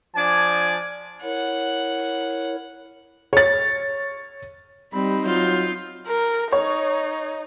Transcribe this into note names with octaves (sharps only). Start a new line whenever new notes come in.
F3 D4 D5 G#5
E4 A#4 C#5 F#5
C#5 A6
G3 C4 D#4 B5
F#3 F4 G6
A#4
D#4 C#5